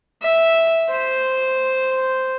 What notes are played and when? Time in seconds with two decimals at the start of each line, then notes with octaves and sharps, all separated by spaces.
0.22 E5
0.89 C5